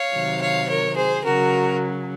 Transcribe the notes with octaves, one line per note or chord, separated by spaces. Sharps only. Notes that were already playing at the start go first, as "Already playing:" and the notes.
Already playing: C#5 F5
C3 D#3 F#3
C#5 F5
A#4 C#5
G#4 C5
C#3 F#3 F#4 A#4